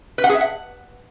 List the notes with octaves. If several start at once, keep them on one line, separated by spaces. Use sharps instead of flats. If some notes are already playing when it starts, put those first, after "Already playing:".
B4
F#5
G#4
E5
F#5